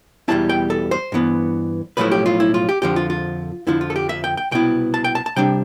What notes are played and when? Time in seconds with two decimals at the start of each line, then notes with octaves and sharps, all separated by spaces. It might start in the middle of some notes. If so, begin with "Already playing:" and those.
0.28 E2 B2 G3 C4 E4 A5
0.49 G5
0.70 A4
0.91 C5
1.12 G2 E3 B3
1.97 B1 A2 F3 A3 E4 B4
2.11 G4
2.26 F4
2.40 E4
2.54 F4
2.69 G4
2.82 F2 D3 F3 G4
2.96 F4
3.10 F4
3.67 F2 D3 F3 E4
3.81 F4
3.90 A4
3.96 G4
4.09 E5
4.24 G5
4.37 G5
4.51 C2 B2 B3 E4 G5
4.94 A5
5.04 G5
5.15 A5
5.26 A5
5.36 C3 G3 D4 G5